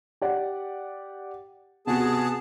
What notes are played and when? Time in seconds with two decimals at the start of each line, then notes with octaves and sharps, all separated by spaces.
0.22 G4 D5 F#5
1.87 C3 B3 F#4 G#4 A5